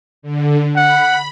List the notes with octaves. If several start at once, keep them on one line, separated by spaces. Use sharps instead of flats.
D3
F#5 B5